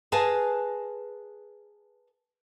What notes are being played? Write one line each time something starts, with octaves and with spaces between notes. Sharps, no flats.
G#4 A#4 B4 F5 G#5 A5